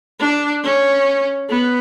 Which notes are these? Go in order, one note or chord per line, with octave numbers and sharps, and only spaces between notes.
D4
C#4
B3